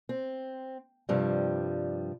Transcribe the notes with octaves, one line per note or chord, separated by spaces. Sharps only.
C4
G2 C3 F3 G3